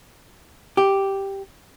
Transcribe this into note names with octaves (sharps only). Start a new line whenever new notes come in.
G4